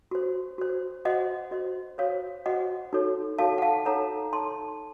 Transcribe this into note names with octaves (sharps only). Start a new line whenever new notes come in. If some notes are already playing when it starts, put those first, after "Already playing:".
F#4 C5
F#4 C5
F#4 C5 D#5 F#5
F#4 C5 D#5
F#4 C5 C#5 F5
F#4 C5 D#5 F#5
D#4 F#4 A4 C#5
D#4 F#4 A4 C#5 F5 A5
F#5
F5 A5
D#4 A4 C#5 F#5 A#5
D#4 A4 C#5 A5 C6